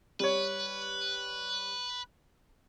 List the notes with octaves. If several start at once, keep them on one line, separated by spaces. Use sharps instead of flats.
G3 B4 C#5